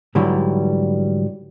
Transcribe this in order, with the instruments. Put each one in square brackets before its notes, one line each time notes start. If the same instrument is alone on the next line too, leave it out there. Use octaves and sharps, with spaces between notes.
[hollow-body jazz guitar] G#2 D3 E3 F#3 G3